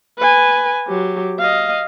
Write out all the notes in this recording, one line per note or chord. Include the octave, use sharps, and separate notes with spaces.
B4 G#5
F#3 G4
D#5 F5